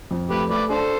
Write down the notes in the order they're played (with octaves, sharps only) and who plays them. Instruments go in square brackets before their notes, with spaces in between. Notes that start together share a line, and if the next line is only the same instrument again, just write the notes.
[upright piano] F2
[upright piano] A3 [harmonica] G4 B4
[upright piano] A3 [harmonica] B4 D5
[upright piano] D4 [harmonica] A4 C5